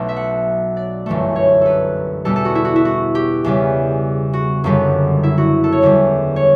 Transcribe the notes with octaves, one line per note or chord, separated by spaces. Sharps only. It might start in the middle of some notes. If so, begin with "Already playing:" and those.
Already playing: B1 B2 A3
E5
F#5
D5
G1 F#2 E3 A3
C#5
A4 B4
E2 B2 G3 B3 A4
A4
F#4
E4
F#4
E4
F#4
G4
E2 C#3 G3 B3
F#4
G1 F#2 D3 G3 B3
E4
F#4
A4
C#5
E2 D3 G3
C#5